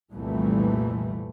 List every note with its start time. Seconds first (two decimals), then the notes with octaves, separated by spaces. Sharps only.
0.13 C2 F2 A#2 E3 G3 A3